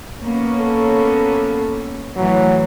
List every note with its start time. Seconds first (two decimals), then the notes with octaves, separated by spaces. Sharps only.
0.22 A#3 B3 C#4
0.60 A4
2.17 A2 E3 F#3